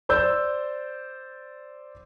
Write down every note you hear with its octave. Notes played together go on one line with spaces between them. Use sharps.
C5 D5 E6 G6